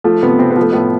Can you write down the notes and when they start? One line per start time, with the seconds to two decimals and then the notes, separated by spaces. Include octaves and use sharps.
0.04 F3 A3
0.23 C3 B3
0.39 C3 C4
0.51 B3
0.57 F3
0.62 A3
0.73 A2 B3